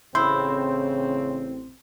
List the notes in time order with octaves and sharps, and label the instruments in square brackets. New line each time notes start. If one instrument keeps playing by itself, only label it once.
[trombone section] A1 C4 [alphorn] C#3 [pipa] E4 [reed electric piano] C6 G6